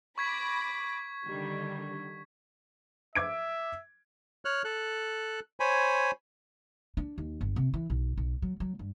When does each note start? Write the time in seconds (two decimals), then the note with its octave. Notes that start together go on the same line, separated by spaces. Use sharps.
0.18 B5 C#6 D6 G#6 A#6 B6
1.26 D3 D#3 G3
3.15 E5 D6 G#6 D7
4.45 C#5 F6 F#6
4.64 A4 F#6
5.60 C5 C#5 G#5 B5
6.97 D4
7.18 D#2
7.41 G1
7.56 C3
7.74 E3
7.90 B1
8.17 B1
8.42 F#3
8.60 F#3
8.79 G2